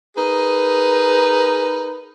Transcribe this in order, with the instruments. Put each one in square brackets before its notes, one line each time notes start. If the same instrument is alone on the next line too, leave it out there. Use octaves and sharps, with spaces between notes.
[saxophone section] D#4 G#4 A#4 B4